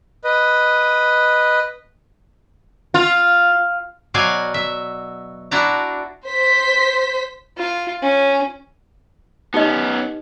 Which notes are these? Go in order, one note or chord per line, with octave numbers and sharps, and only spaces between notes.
B4 D#5
F4
B2 F#3 F#4 D5 F5 G#5
E5
D4 E4 F#4 A5 A#5
C5 B6
F4
C#4
B3 C#4 D#4 G4 D#5